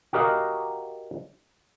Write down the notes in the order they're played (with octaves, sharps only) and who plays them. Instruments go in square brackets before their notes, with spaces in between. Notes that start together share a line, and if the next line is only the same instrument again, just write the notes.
[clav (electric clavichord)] F#4 G4 A#4 D#5 F5